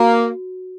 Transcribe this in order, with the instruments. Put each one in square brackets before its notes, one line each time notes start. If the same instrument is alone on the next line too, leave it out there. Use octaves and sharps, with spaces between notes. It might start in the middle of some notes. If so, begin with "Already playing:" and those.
Already playing: [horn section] A#3 [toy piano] F#4